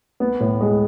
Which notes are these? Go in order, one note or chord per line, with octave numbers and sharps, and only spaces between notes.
B3
A2
G#3